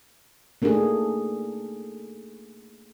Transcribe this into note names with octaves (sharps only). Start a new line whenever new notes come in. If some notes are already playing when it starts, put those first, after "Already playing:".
A3 A#3 D4 D#4 G#4 A4